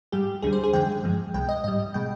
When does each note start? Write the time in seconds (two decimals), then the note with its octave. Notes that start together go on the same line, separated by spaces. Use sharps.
0.12 G#2 G3 G4
0.42 D2 D3 G3 G#4
0.53 C5
0.64 G#4
0.73 F2 D3 G#3 G5
1.04 G2 F3 G#3
1.34 C2 B2 G#3 G5
1.49 D#5
1.64 G#2 G3 D#5
1.94 B2 G#3 G5